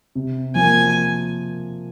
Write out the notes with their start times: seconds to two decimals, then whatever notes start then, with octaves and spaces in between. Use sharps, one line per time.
0.15 C3
0.55 F3 A#3 G#5